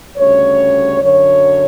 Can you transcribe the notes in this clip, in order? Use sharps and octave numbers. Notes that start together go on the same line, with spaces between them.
D2 C#3 G3 C#4 C#5
F#2 D3 F#3 C#5